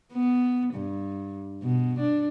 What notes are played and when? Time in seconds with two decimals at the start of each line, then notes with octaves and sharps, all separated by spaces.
0.13 B3
0.74 G2
1.62 B2
2.00 D4